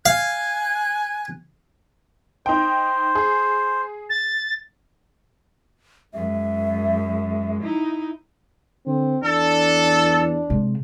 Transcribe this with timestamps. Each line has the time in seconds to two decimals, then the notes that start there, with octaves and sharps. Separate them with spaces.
0.06 F5 G#5 F#6 G#6
2.46 D#4 C5 G5
3.15 G#4
4.10 A6
6.14 F#2 G#3 E5
7.64 D#4 E4
8.86 D3 C4
9.23 E2 D4 A4
10.50 C3 G#3